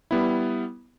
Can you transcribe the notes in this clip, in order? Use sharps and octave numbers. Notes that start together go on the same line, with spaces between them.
G3 B3 E4